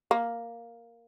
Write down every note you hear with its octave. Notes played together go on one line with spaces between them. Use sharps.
A#3